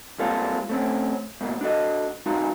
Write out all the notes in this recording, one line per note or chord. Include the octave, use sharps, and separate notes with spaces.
G3 G#3 A#3 C4 F4 A4
A3 C4 C#4
G#2 B2 A#3
D4 F#4 A4 D#5
G#3 D#4 F4 F#4